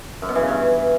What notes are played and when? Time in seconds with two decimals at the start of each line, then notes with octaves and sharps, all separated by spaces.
0.22 F#2
0.29 B2
0.35 E3
0.42 C#3
0.48 G2